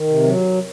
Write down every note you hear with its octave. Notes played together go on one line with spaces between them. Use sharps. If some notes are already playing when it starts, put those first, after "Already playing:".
Already playing: D#3
C3
F#3